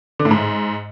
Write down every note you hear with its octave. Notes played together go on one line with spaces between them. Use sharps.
D3
A2
G#2